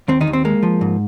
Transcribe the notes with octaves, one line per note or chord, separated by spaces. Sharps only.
D#2 C4
D#3 D#4
D#2
C4
G#3 A#3
F3
G#2